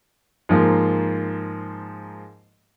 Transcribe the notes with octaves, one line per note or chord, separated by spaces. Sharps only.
G#2 F3 A#3